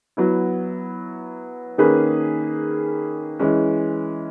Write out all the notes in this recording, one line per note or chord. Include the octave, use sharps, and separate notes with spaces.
F#3 B3 E4
D#3 A#3 C#4 G#4 B4
E3 G#3 C#4